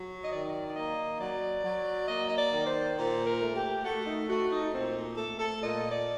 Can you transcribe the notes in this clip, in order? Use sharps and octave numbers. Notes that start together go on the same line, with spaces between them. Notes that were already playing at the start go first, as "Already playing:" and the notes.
Already playing: F#3
D#5
D#3 D5
D5
A#3 D#5
F#3 D5
F#3
A#3 D#5
D#5
D5
D#3
C5
A#2 C5
A#4
A3
G4
A3 F#4
D#4
A3 F#4
D#4
A#2 C4
A3 A4
A4
A#2 D#5
D5